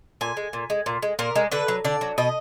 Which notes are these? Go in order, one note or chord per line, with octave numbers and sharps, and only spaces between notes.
A#2 G#5
G#3
A#2
G#3
A#2
G#3
A#2 A#4
G#3
D3 B4
F#3
D3 D5
F#3
B2 D#5